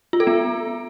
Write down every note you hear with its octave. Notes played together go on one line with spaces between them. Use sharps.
F4
A4
B3